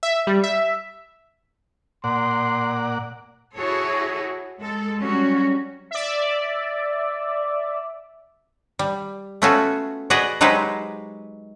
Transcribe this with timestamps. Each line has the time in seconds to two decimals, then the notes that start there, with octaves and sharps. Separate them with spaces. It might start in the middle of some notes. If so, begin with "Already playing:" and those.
0.03 E5
0.27 G3
0.44 E5
2.04 A#2 D5 F#5 C6
3.55 E4 F#4 G#4 A4 C#5
4.61 G#3 A4
5.00 F#3 G3 C#4 F#4
5.91 D5 E5
8.79 G3
9.42 A3 B3 C#4 F4 F#4 A4
10.10 F#4 G#4 B4 D5 D#5 F#5
10.41 F#3 G#3 D#4 G4 B4 C5